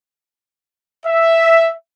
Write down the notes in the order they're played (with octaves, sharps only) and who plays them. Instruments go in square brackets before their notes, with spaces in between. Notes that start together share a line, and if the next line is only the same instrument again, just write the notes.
[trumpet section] E5